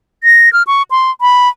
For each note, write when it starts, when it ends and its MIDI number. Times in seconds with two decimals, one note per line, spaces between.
0.24 0.52 94
0.53 0.63 89
0.67 0.83 85
0.91 1.11 84
1.21 1.49 83